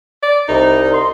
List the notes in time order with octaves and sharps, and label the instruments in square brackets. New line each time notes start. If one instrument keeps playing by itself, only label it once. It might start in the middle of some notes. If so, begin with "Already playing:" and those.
[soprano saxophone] D5
[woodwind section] C2 [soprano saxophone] D#4
[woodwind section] C6